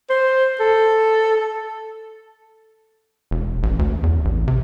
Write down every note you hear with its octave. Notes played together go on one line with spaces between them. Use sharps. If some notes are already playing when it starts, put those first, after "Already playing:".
C5
A4
E1
A1
D2
E2
A1
C3